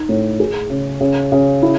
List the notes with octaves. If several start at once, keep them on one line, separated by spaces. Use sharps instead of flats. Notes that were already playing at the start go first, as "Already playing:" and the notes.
Already playing: D#4
A2
G#4
C#3
C#3
C#3
E4